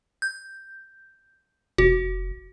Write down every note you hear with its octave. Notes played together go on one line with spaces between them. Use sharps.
G6
F1 F#4